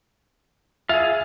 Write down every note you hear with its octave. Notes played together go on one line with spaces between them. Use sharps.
F4 G#4 E5